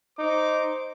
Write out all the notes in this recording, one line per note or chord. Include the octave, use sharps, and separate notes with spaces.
D#4 C5 D6